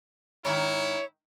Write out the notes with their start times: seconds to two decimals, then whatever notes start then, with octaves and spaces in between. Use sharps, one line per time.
0.45 G#2 D#3 D#4 E4 C#5